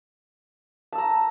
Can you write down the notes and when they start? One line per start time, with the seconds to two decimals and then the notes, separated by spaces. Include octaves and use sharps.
0.93 A5
0.95 E6
0.98 A#5